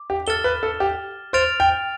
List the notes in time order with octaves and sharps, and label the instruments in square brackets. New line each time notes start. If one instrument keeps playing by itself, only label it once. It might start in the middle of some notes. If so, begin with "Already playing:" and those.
Already playing: [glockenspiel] D6
[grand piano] G4
[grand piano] A4 [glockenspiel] F6 A6 E7 G7
[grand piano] B4
A4
G4
[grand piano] C5 [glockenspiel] F6 A6 D7 F7
[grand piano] G5